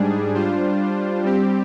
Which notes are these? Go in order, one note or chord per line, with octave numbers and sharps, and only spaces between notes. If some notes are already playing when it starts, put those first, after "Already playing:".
Already playing: G#2 G3 D4 G#4
G3 D4 F4 C5
G3 C4 G4